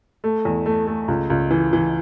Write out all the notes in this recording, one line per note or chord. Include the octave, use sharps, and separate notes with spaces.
A3
E2
A3
A3
C#2
C#2
E3
E3